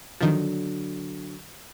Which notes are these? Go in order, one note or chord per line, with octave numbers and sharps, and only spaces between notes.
D3 D#3 F3 F#3